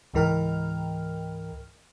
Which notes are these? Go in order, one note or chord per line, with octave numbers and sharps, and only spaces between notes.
C#2 G#2 E3 A#4 G5 F6